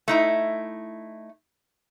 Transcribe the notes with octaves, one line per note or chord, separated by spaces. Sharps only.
A3 D#4 E4